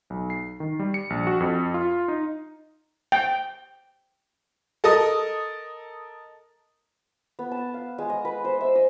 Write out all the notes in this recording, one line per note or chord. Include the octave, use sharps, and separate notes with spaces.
B1
C7
D#3
G3
C#7
A#1
F#4
F2
F4
D#4
G5
A4 A#4 D#5 D#6
B3
A5
F5
G#3
D#5
B4
C5
E5
D#5